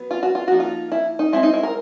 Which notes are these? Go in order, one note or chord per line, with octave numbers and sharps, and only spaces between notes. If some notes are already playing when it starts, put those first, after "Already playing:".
Already playing: F#3 B3
F4
F#4
F4
F3 A#3 D#4 F#4
F4
E4
D#4
G#3 C4 D#4 E4
D#4
E4
A#4